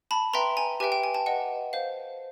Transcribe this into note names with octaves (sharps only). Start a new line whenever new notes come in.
A5 B5
B4 E5 G5 A#5 C6
G#5 A#5
G4 B4 E5 G5 G#5
G5
G#5
G5 A5
B4 D#5 F#5
C5 F5